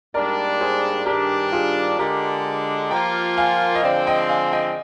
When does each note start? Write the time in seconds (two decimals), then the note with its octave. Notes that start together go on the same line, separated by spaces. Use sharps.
0.14 G#2 G3 A#3 D4 A#4 D5
0.61 G#4 C5
1.06 G2 D#3 G3 D4 G4 A#4
1.52 F4 G#4
1.99 D3 G#3 D4 G4 A#4
2.91 F3 A#3 F4 G5 A#5
3.38 F5 G#5
3.75 D#5
3.83 D3 F3 G#3 C4 D5 F5
4.07 D#5 G5
4.29 F5 G#5
4.52 D#5 G5